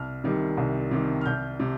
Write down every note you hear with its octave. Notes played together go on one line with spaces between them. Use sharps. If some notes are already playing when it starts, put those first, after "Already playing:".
Already playing: C2 F6
C3 D#3 G3
C2
C3 D#3 G3
F6
C2 G6
C3